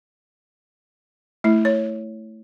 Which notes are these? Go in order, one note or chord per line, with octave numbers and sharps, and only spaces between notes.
A3 E4
C#5